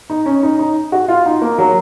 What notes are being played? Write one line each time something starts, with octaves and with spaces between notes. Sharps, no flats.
D#4
C#4
D#4
D#4
F#4
F4
D#4
A#3
F#3